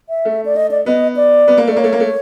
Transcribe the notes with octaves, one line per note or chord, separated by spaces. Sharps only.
E5
A3
D5
D#5
D5
B3 D#5
D5
B3
A#3
A3
D5
A#3 C#5
A3
A#3
A3